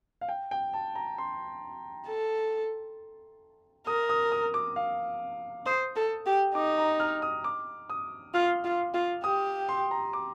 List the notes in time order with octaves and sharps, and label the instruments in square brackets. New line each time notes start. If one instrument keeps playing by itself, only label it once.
[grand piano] F5
G5
G5
A5
A#5
C6
[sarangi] A4
[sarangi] A#4 [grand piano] D#6
[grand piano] D#6
D#6
D6
F5
[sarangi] C5 [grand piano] D#6
[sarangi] A4
G4
[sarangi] D#4 [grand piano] D6
[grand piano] A#5
F6
D#6
D6
D#6
[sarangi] F4 [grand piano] F6
[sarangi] F4
F4
[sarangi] G4 [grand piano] D#6
[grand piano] C6
A#5
D6